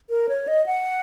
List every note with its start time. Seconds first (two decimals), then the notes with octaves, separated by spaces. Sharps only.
0.10 A#4
0.29 C#5
0.48 D#5
0.66 F#5